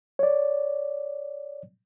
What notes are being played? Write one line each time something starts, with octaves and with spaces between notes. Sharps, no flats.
C#5 D5